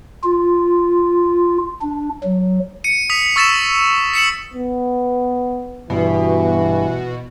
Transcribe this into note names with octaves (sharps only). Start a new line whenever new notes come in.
F4
D4
F#3
C#7 D#7
D#6 B6 F7
C#6 E6 A6 B6 E7
B6 C#7 E7 F#7
B3
G2 B2 E3